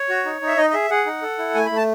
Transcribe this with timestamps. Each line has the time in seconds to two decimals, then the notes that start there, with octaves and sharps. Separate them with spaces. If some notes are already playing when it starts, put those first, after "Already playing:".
Already playing: C#5
0.09 F#4
0.26 D#4
0.41 D#4
0.47 E5
0.57 D#4 D#5
0.70 D#5
0.73 G#4 E5
0.90 G#4 F#5
1.06 D#4
1.22 A4
1.38 E4
1.55 A3 G#5
1.66 B5
1.71 A3
1.77 A5